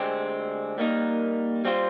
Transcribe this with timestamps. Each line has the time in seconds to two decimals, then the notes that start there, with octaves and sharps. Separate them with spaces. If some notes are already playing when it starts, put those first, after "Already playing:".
Already playing: D2 D3 G#3 C4 G4
0.78 G3 A#3 D#4 A#4
1.65 G3 C4 F4 C5